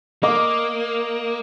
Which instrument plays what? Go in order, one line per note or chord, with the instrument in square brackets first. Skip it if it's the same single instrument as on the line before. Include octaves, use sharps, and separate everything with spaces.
[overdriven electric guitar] A#3 [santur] D#5 D6